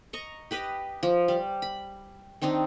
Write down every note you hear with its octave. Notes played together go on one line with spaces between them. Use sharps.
D#5 A#5 C#6
G4 B4 D#5
F3
G3
B5
D#3 C4 D4 D#4